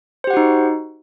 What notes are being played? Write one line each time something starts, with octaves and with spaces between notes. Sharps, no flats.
D#4 F#4 G4 C5 F#5